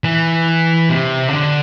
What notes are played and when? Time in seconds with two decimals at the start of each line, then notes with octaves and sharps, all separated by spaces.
0.04 E3
0.90 C3
1.28 C#3
1.33 D3